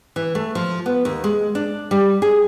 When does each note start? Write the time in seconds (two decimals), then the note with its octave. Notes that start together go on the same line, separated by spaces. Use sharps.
0.16 E3
0.35 A3
0.55 F3
0.86 B3
1.05 D#2
1.24 G#3
1.55 D4
1.91 G3
2.22 G#4